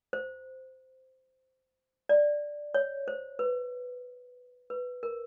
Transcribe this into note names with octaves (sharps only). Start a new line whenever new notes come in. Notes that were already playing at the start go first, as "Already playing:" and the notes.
C5
D5
C#5
C5
B4
B4
A#4